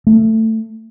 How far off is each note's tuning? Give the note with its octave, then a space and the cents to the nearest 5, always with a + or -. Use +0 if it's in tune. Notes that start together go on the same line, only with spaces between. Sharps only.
A3 +15